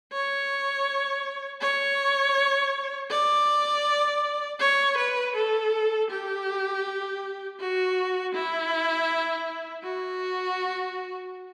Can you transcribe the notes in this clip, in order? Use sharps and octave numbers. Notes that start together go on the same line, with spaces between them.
C#5
C#5
D5
C#5
B4
A4
G4
F#4
E4
F#4